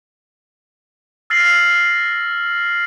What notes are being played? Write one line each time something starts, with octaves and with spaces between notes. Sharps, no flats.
E6 F6 A6 A#6 C7 F#7